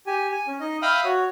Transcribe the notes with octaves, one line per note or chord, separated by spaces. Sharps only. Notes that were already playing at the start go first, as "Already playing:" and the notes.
G4 G#5
G#5
C#4
D#4 D#5
E5 F5 G5 B5 D#6 F6
F#4 C#5